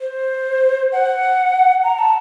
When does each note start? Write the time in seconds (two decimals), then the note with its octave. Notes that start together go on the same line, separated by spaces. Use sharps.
0.01 C5
0.92 F#5
1.83 A#5
1.99 A5